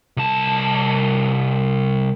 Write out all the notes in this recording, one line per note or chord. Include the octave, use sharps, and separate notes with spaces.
C2 A5